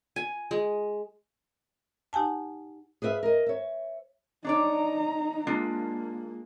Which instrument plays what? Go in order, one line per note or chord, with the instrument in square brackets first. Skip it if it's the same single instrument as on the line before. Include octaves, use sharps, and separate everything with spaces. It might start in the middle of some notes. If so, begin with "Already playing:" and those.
[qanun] G#5
G#3
[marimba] D#4 G4 F#5 G#5 A5
[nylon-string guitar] G#4 B4 D5 E5 F5
A#4 D#5
C#5 E5
[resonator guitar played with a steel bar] D4 C#5 D5 [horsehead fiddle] D#4 A#5
[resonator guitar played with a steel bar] G#3 D4 F4 [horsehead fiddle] A#3